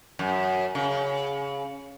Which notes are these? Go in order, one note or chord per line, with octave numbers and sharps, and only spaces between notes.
F#2
C#3